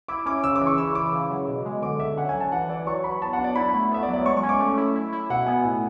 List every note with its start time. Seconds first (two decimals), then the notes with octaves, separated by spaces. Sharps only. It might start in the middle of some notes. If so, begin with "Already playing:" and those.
0.08 E4 D6
0.26 C#4 D6
0.44 C#3 E6
0.56 D6
0.61 E3
0.66 C#6
0.78 E4 E6
0.95 E4 D6
1.13 C#3
1.30 F#3
1.48 B2
1.65 G#3
1.82 D3 D6
2.00 D3 E5
2.17 C#4 F#5
2.29 G#5
2.34 F#3
2.40 A5
2.52 E3 F#5
2.69 E3 D5
2.87 F#3 C#6
3.04 F#3 B5
3.21 B3 A5
3.33 F#5
3.39 D4
3.44 D5
3.56 E4 B5
3.74 A3
3.91 B3 E5
4.03 D5
4.08 F#3
4.13 D5
4.25 G#3 C#6
4.37 C#6
4.43 C#4
4.49 D6
4.60 A3
4.77 E4
4.95 E4
5.12 E4
5.30 B2 F#5
5.46 B3 G#5
5.64 A2